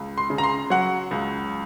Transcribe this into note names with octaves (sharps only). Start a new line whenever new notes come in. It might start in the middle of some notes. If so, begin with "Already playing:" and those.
Already playing: C#2
C6
C#3
A#5
C6
F#3 F#5
C#2